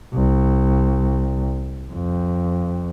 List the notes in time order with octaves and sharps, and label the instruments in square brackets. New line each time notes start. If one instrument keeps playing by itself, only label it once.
[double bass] C2
F2